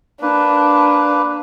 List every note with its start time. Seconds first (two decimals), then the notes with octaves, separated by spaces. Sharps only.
0.22 A#3 D4 B4